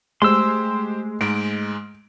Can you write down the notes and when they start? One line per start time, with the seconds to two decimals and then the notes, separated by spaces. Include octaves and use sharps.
0.22 G#3 A3 G4 C5 C6 E6
1.21 G#2 G#3 D7